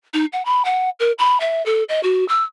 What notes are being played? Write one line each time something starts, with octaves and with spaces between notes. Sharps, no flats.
D#4
F#5
B5
F#5
A#4
B5
E5
A4
D#5
F#4
E6